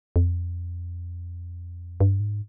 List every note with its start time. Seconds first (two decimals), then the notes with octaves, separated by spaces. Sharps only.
0.16 F2
2.00 G2
2.20 G#2